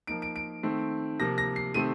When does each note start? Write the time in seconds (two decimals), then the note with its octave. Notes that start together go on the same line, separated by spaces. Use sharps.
0.07 F3 A#3 D#4 D7
0.22 D7
0.36 D7
0.63 D#3 A3 C4
1.19 C3 F3 A#3 A#6
1.38 A#6
1.56 C7
1.74 C3 D#3 A3 C4 D#7